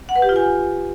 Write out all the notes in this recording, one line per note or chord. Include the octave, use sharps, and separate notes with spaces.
F#5
B4
G4
F4
G#5